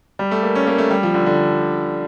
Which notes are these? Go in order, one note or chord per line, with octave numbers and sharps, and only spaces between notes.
G3
A3
A#3
C#4
A#3
A3
G3
F3
D3
D3